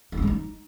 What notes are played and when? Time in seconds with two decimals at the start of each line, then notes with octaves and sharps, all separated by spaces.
0.12 E4
0.17 C#4
0.22 G#3
0.27 D#4